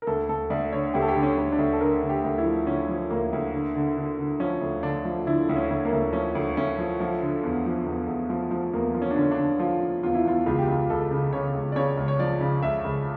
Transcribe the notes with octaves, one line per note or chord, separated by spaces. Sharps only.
A#4
D2 A4
D2 A4
D2 D5
D3 C#5
D2 G4
A4
G4
D3
C#4
D2
D4
D2
A4
D3 A#4
D3
G4
D2
E4
F3
D3 C#4
F3
D2 A#3
D2
D3
D3
D3
D3
F3 C#4
D2
D3 D4
F3
D3 E4
D2
C#4
D2
A#3
D2
F3 C#4
D2
D2 C#4
F3
F3
D3
E2
F3
E2
E2
F3
F3
E2 A#3
F3
C#4
D4
D3 C#4
D4
D3
F3 F4
F3
E2 F4
E4
E2 F4
C#2 F4
G4
C#2 F4
C#2 A4
C#3
C#3 C#5
C#2
D5
C#3 C#5
C#2
C#5
F3 D5
C#3
C#2 E5
C#2